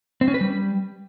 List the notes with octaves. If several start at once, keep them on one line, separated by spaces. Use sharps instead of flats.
C4
C#4
B4
G3